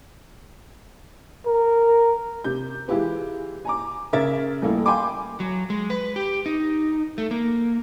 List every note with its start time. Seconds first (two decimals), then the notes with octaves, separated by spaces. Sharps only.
1.46 A#4
2.44 C3 G6
2.88 E3 G#3 E4 F4 G4 B4
3.65 G#5 A#5 D6
4.13 C#3 A#4 E5 G#6 A6
4.62 D#1 A3 A#3 E4
4.86 F5 G5 G#5 B5 C6 D6
5.40 F#3
5.70 G#3
5.90 B4
6.16 G4
6.46 D#4
7.18 A3
7.31 A#3